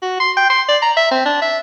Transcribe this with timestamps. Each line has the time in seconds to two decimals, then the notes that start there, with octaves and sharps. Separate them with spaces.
0.02 F#4
0.20 C6
0.37 G5
0.50 C6
0.69 D5
0.82 A#5
0.97 E5
1.11 C4
1.26 D4
1.42 E5